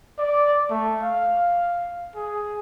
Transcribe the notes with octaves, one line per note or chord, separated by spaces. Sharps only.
D5
A3
F5
G#4